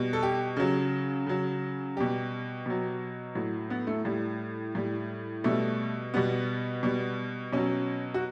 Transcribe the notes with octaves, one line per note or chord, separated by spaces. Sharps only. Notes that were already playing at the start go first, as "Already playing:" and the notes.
Already playing: B2 G3
A4
G4
C#3 F#3
C#3 F#3
B2 G3 G4
B2 F#3
A2 F#3
B3
A3
A2 G3
A2 G3
B2 G3 A3
B2 G3 B3
B2 G3
B2 F#3 C#4
F#4